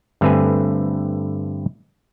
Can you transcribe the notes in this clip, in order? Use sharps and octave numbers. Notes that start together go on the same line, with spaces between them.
G2 D3 A3 C4 B4 G#5